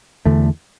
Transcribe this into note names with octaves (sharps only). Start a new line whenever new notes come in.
E2 D3 A3